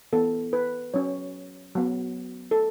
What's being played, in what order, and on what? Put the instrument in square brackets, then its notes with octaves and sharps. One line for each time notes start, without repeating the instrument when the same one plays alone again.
[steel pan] E3 B3 A4
B4
F#3 C#4 C#5
F#3 B3
A4